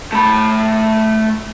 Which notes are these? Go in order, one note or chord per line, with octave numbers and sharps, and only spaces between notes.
A3 B5